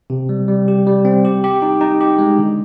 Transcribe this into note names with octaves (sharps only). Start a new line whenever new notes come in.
C3
G3
G3
G4
G3
C4
G4
G4
D#4
D#4
G4
G#3
D3